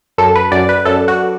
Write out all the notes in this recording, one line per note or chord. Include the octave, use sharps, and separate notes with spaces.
F#2 A4
B4
F#2 D5
B4
F#2 A4
F#4